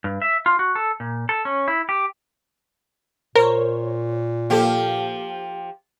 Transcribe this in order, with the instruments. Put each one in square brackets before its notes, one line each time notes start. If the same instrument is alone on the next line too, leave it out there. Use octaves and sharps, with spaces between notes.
[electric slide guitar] G2
E5
F4
F#4
A4
A#2
A4
C#4
E4
G4
[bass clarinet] A#2 [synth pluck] A#4 [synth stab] C5 C#5
[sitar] F3 G4 [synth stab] A#3 A4 F5